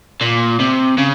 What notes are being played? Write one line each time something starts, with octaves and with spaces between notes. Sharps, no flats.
A#2
C3
C#3